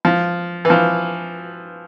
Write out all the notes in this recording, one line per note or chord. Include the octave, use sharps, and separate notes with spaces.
F3
E3
F3